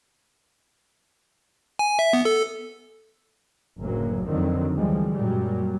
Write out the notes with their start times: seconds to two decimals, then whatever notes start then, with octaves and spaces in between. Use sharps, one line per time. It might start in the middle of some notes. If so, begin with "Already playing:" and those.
1.79 G#5
1.99 E5
2.13 B3
2.25 A4
3.79 F#1 D2 A2 F#3 A#3
4.25 F2 D3 D#3 F#3 C4
4.75 D2 E3 F3 G3 G#3
5.13 F#2 A#2 F#3 G3